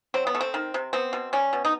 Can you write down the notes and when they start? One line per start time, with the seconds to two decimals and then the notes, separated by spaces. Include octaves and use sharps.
0.14 F#3 C4
0.27 B3
0.35 A3
0.41 C4
0.54 D#3
0.74 C3
0.93 B3 C4
1.13 B2
1.33 G3 C#4
1.53 B2
1.65 D#4